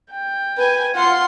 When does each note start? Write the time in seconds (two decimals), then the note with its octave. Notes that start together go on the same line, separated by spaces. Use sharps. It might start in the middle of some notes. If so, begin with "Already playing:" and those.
0.11 G5
0.57 B4 G#5
0.95 F4 F#5 C6